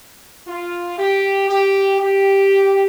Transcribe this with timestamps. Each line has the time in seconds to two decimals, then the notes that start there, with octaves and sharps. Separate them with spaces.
0.48 F4
0.99 G4
1.49 G4
2.00 G4